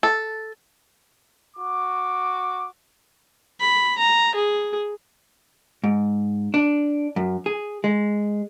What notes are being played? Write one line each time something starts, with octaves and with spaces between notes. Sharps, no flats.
A4
F#4 D6
B5
A#5
G#4
G#2
D4
F#2
G#4
G#3